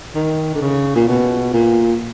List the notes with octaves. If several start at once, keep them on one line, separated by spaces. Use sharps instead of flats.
D#3
D3
C#3
A#2
B2
A#2